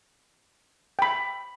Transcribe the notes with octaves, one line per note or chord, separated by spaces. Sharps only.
G5 B5